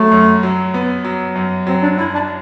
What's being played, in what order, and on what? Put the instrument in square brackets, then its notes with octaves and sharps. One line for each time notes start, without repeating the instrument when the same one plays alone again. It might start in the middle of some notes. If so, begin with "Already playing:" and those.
Already playing: [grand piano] F#3 [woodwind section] A3
[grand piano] F#2
F#3
B3
F#3
F#2
[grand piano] F#3 [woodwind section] C4
[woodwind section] D4
[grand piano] F#2 [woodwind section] E4
[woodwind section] D4